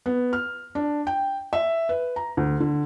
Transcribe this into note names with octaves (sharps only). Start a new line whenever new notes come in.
B3
F6
D4
G5
E5
B4
A#5
D2
D3